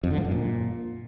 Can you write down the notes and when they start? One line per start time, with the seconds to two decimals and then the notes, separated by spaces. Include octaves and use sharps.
0.04 F2
0.10 D3
0.17 G#2
0.24 F#2
0.31 A#2